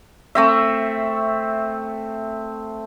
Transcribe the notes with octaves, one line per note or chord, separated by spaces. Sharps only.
A3 C4 E5